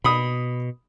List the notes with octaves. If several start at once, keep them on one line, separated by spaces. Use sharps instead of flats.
B2 B5 D#6